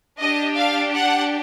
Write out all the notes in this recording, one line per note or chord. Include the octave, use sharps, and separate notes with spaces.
D4 G4 D#5
F5
F#5